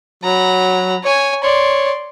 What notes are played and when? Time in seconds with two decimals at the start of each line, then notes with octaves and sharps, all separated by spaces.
0.24 F#3 A#5 B5
1.03 C#5 G#5
1.43 C#5 D5 C6